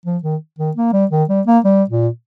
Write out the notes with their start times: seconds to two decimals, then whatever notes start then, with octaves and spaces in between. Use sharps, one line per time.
0.06 F3
0.24 D#3
0.59 D#3
0.76 A#3
0.93 G3
1.11 D#3
1.29 G3
1.47 A#3
1.64 G3
1.90 A#2